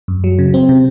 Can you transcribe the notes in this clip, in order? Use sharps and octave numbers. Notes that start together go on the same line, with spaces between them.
F#2
F#3
C#3
C4
C3